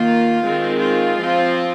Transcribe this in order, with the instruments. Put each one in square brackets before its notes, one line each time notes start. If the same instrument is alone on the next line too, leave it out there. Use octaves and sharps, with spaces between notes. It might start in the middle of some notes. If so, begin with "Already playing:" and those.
Already playing: [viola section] D#3 A#3 F4
D#3 G#3 C4
F4
F3 C4